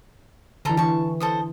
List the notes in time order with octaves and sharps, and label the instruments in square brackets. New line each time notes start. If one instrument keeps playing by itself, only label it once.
[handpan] D3 E3 [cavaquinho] A4 A#5 C6
[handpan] E3 [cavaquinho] A5 C#6
[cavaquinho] A4 C5 D#6